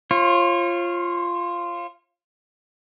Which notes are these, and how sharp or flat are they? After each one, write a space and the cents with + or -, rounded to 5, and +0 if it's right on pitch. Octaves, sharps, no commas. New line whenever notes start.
F4 -10 C#5 -40